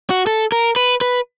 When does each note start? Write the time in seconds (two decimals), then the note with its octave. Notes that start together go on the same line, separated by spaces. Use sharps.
0.10 F#4
0.27 A4
0.52 A#4
0.76 B4
1.01 B4